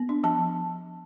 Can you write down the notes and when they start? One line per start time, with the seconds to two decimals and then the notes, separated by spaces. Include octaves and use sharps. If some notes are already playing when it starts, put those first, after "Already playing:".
Already playing: B3
0.09 D4
0.24 F3 A5
0.39 F3